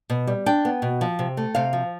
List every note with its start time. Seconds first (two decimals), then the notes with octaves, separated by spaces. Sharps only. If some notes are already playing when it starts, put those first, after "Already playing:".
0.10 B2
0.27 G3
0.46 D4 G5
0.65 B3
0.82 B2
1.01 F3
1.19 C3
1.37 A3
1.55 C3 F5
1.73 F3